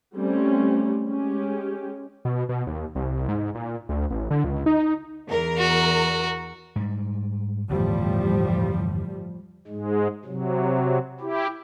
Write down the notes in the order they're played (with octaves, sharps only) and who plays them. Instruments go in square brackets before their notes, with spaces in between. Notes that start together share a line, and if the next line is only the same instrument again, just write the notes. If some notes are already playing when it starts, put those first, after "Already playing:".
[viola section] G3 A3 C4 C#4
G#3 C#4 G4
[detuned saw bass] B2
B2
D#2
C2
G#2
A#2
D2
A1
D3
C#2
D#4
[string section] E2 A#4
[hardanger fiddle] F#4
[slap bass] G#2 G3
[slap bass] G1 E2 [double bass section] A2 F3 G3
[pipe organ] G#2 G#3
C3 F#3
E4 G4